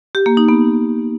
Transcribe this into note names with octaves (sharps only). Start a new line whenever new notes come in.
G4
A#3
D#4
B3